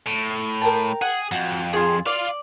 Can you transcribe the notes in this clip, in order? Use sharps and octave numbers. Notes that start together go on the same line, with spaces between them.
A2
A#4 G5 A5
G#4 F#5
F2 F#4
F4 G#4
F4 D5 F5